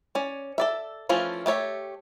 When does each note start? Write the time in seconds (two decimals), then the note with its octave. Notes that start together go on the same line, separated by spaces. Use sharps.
0.15 C#4 D5
0.58 A4 D5 E5
1.09 E3 F3 A3 C#4 F4
1.46 A3 G4 C#5 E5